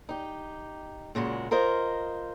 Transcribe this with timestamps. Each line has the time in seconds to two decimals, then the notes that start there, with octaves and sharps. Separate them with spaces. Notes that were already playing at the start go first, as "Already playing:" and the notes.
0.09 D#4 G4
1.15 A#2 C#3 G#3 F#4
1.51 F4 A#4 C5 D#5